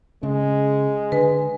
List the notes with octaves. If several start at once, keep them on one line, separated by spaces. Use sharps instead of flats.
C#3 G#3
D3 B4 G#5